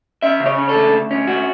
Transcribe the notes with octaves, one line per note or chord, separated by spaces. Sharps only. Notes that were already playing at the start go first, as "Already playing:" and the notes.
C#4 E5
C#3
C#5
C#3
A4
D2
D2
C#4
D2 F#4